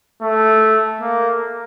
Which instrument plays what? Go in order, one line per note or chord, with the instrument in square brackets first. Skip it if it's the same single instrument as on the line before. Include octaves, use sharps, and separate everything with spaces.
[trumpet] A3
A#3